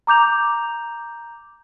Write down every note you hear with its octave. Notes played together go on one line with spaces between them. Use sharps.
A#5 D6 G6 F7